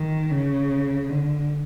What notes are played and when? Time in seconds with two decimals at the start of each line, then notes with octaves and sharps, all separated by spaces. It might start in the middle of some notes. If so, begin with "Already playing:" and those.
Already playing: D#3
0.31 C#3
1.09 D3